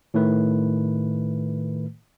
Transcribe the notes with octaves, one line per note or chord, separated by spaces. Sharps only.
A2 D#3 A3 B4